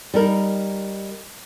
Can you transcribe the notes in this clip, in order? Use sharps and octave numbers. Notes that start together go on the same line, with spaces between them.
G3 D#4 A#4